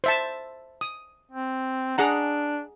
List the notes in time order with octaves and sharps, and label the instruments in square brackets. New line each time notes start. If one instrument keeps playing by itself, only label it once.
[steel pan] C5 E5 A5
D#6
[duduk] C4
[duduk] D4 [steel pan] G#4 F#5 A#5